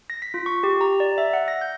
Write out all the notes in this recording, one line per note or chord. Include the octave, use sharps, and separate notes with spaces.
A#6
B6
F4
C#6
G4
A#5
D5
E5
F#5
A#6
G6